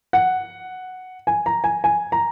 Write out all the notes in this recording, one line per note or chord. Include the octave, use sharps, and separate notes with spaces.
F#5
G#5
A#5
G#5
G#5
A#5